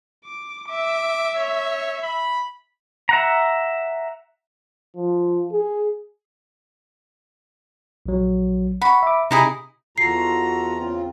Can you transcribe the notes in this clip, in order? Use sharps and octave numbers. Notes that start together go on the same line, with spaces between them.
D6
E5 D6
C#5
B5
E5 F#5 A#5
F3
G#4
A#1 F#3
F#5 B5 C#6
E5 D6
C3 D#4 E4 G#4
E2 F4 F#4 A4 A#5 C7
C#3 C4 F4